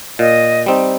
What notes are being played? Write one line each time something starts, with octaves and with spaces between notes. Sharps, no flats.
A#2 D#5
G3 C4 D#4